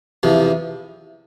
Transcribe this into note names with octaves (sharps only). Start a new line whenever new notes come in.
E2 C3 F3